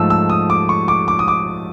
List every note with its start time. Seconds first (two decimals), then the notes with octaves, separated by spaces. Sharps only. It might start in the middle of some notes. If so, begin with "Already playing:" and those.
Already playing: G#2 F3 A3 E6
0.10 E6
0.30 D#6
0.50 D6
0.69 C#6
0.88 D6
1.08 D6
1.19 D#6
1.28 D6